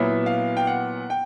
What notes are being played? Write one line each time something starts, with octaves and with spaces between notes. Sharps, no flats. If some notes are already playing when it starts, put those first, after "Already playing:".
Already playing: A#2 F#3 B3 E4 E5
F5
G5
F#5
G5